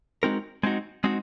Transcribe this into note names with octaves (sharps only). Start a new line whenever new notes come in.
G#3 C4 D#4 F#4 A#4
G#3 C4 D#4 F#4
G#3 C4 D#4 F#4